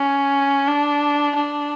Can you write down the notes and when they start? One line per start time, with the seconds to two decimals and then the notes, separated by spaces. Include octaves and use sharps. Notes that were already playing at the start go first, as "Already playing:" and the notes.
Already playing: C#4
0.68 D4
1.35 D4